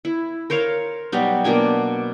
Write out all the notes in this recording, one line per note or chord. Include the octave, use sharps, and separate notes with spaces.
E4
A#4 C5 C#5 F5
B2 F#3 G3 D#4
B2 A#3 D4 G#5